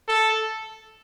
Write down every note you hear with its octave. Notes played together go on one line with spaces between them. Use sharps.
A4